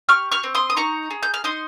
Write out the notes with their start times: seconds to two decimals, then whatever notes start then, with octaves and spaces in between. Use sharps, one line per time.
0.09 G4 C#6 F6
0.32 C#6 F6
0.43 C4
0.55 C6 D#6
0.70 D#6
0.76 D#4 A#5 C#6
1.11 G#4
1.23 G6
1.34 F6
1.44 D#4 C6 D#6